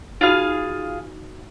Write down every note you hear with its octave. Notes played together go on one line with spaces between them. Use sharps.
D#4 F4 F#4 G#4 F5 B5